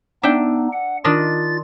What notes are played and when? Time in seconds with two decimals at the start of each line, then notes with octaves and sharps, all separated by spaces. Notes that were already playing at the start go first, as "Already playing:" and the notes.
0.23 B3 D4 D#4 E5 G5
0.73 F#5
1.04 D#3 D4 F4 D#5 A6